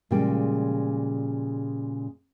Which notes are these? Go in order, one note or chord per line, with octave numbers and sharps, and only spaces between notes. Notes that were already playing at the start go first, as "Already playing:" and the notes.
A#2 C#3 F3 G3 G#3 G5